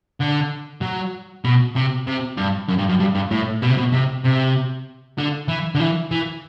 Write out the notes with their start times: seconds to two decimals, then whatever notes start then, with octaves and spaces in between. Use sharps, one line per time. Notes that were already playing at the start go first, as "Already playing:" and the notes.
0.21 D3
0.82 F#3
1.44 B2
1.76 C3
2.07 C3
2.38 G2
2.69 F#2
2.79 G2
2.90 F#2
3.00 G2
3.15 G2
3.31 A2
3.62 B2
3.69 C3
3.77 B2
3.93 C3
4.24 C3
5.18 D3
5.48 E3
5.75 D3
5.80 E3
6.11 E3